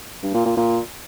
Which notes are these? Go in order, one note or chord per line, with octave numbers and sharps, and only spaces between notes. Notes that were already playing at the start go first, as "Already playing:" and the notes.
G2
A#2
A#2
A#2